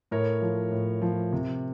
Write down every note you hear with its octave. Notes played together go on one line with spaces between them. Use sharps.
A2 A#4 C#5
F3
A2
F3
C3